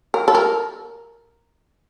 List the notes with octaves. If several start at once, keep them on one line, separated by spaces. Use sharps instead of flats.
A#4
A4
A#4